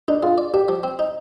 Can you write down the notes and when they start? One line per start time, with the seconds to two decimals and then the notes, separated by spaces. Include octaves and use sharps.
0.08 D4 D#4
0.23 F4 G#4
0.38 D5
0.54 D4 G4
0.68 F3
0.83 C4
0.99 D#4